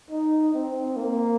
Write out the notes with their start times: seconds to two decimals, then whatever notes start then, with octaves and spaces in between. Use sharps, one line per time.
0.11 D#4
0.54 C4
0.96 A#3